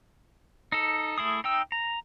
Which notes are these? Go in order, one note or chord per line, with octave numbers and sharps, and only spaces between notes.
D#4 A4
A3 E4 G#4 D#6
D#4 G5 E6
A#5